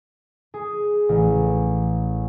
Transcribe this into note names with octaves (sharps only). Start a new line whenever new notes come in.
G#4
A1